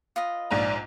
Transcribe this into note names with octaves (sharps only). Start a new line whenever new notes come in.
F4 B4 D#5
A#1 G#2 D5 A#5